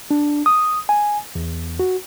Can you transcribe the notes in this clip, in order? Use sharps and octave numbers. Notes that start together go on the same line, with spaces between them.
D4
D#6
G#5
E2
F#4